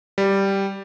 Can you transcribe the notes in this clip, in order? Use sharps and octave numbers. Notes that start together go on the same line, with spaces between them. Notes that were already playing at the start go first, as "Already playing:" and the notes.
G3